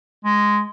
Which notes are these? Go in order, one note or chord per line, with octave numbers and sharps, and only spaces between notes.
G#3